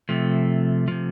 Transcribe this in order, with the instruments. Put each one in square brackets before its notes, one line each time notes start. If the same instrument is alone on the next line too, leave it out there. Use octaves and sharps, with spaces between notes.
[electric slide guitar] C3 F3 A3
C3 F3